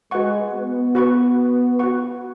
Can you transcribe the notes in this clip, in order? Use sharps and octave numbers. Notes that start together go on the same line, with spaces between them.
G#3 F#4 B4 F#5 C#6
B3
F#4 B4 F#5 C#6
F#4 B4 F#5 C#6